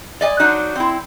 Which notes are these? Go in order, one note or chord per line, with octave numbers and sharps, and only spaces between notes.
D5 D#5 G#5
F#3 D4 D#4 F#4
C4 E4